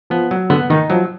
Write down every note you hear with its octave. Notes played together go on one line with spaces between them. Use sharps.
F3 B3
F#3
D3 B3
D#3 D#4
F3 F#3